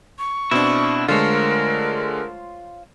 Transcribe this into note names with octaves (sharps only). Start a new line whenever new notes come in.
C#6
B2 C4 D4 E4
D3 G#3 A3 F4 A#4 C5 C#5